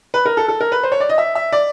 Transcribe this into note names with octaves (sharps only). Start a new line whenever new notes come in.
B4
A#4
A4
A4
A#4
B4
C5
C#5
D5
D#5
E5
E5
D5